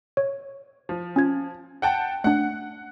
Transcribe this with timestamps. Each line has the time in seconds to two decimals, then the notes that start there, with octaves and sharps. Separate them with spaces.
0.17 C#5
0.89 F3
1.16 C#4 F4 G#6
1.82 F#5 G5 A5
2.24 A3 D4 F#5